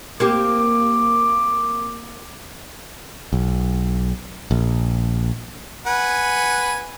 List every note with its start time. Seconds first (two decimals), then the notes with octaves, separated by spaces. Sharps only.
0.20 A#3 C4 G4 D6
3.33 B1
4.51 A#1
5.87 B4 F#5 G#5